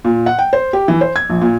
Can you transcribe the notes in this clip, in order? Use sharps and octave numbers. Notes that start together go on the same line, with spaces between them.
A#2
F#5
G5
C5
G4
E3
C5
G#6
A#1
A#2